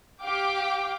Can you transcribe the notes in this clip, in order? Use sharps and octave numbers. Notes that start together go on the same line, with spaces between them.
G4 F5 G5 D6